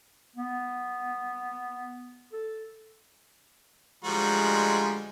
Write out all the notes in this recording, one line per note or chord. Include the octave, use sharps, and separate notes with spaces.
B3
A4
D2 F3 G3 G#3 F#4 A#5